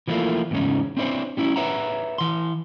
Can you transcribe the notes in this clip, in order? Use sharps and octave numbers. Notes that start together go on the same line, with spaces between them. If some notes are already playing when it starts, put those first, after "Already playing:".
E3 F3 A3 A#3 E4 F4
E2 G#2 C#3 C#4 D#4
C4 D4 E4 A4 C5 C#5
G3 C#4 E4
B4 C#5 E5 F#5 A#5
E3 C6